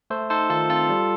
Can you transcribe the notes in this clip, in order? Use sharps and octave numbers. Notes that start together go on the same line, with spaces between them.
A3 A4 C5
D#4 A4 C5
D#3 F4 A4
C4 F4 A4
G3